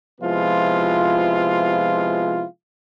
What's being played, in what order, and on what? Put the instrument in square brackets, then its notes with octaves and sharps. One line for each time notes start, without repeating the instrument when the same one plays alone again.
[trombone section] C3 F3 G#3 B3 E4 F4